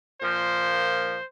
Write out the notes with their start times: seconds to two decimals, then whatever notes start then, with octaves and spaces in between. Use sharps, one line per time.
0.21 A#2 F3 A#3 C5